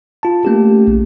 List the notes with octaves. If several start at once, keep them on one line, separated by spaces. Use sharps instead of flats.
F4 A5
A3 A#3 C#4 G4
A#1